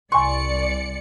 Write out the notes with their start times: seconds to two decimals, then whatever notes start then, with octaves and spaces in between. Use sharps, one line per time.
0.12 C2 D5 G#5 C6 C#6 C#7